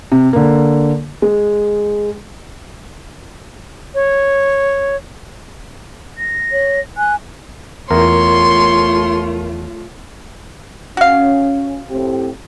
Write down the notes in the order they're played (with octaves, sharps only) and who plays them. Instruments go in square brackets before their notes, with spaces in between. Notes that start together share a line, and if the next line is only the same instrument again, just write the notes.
[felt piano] C3
D3 A#3
G#3
[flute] C#5
A#6
[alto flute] C#5
[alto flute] G#5 [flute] F#6
[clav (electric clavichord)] E2 [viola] A3 F4 [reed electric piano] A#4 [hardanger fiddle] C#5 C6
[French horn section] C#4 [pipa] F#4 F5
[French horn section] A2 C4 G4